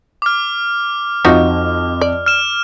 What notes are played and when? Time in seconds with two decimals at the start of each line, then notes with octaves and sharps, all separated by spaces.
0.22 D6 F6
1.25 F2 F3 D#4 F#4 D#5
2.01 D5
2.26 F6 E7